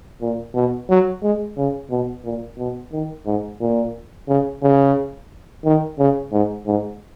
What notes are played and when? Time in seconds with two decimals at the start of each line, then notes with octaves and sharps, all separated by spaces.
0.21 A#2
0.55 B2
0.89 F#3
1.23 G#3
1.57 C#3
1.91 B2
2.24 A#2
2.58 B2
2.92 D#3
3.26 G#2
3.61 A#2
4.28 C#3
4.62 C#3
5.65 D#3
5.99 C#3
6.32 G#2
6.67 G#2